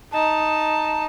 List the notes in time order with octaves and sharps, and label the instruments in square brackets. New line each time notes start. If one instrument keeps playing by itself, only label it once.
[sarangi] D#4 [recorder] A5